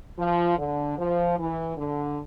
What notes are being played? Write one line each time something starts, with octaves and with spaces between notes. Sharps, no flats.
F3
D3
F3
E3
D3